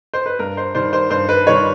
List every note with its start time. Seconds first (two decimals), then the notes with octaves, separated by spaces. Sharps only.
0.14 C5
0.26 B4
0.39 G2 A#4
0.57 C5
0.75 D#3 G3 C5
0.93 C5
1.10 G2 C5
1.29 B4
1.46 D#3 G3 C#5